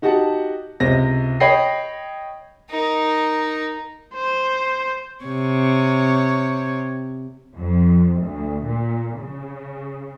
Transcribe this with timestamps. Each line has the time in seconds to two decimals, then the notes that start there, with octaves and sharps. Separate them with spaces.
0.02 D#4 F#4 G4 F#5 A5
0.80 C#2 C3 A#6
1.40 C#5 D#5 G5 B5 A#6 C7
2.70 D#4 A#4
4.14 C5
5.25 C3 C#5
7.55 F2
8.22 D2
8.65 A#2
9.20 C#3